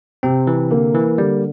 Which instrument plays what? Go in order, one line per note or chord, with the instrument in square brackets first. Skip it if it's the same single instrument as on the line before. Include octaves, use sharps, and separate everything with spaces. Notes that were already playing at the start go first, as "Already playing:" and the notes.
[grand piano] C3 [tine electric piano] C4
[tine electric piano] E3
[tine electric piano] D3 [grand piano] A#3
[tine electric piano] E3
[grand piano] D3 [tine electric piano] G3